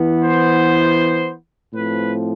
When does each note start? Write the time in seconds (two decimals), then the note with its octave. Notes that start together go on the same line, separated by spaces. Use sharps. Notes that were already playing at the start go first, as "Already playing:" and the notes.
Already playing: E3 B3
0.23 C5
1.74 A2 F3 C4 B4